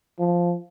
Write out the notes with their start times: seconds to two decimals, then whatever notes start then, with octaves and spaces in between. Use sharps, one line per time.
0.19 F3